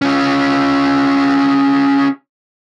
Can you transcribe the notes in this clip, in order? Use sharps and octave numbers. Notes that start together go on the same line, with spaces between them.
C#4 F4